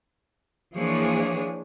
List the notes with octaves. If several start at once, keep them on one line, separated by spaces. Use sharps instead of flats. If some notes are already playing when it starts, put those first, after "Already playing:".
E3 F3 A#3 D4 G#4 C#5